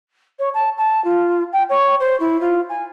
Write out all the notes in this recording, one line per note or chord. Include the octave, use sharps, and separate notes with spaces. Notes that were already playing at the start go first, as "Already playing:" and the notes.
C#5
A5
A5
F4
G5
C#5
C5
E4
F4
G#5